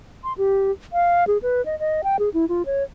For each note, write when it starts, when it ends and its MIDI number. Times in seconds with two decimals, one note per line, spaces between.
0.24 0.33 84
0.38 0.72 67
0.93 1.25 77
1.27 1.38 68
1.42 1.64 71
1.66 1.78 75
1.79 2.01 75
2.04 2.17 79
2.19 2.29 68
2.34 2.45 64
2.49 2.63 65
2.66 2.83 73